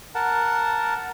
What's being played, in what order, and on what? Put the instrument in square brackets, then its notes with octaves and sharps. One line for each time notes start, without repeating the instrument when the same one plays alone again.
[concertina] A#4 F#5 A5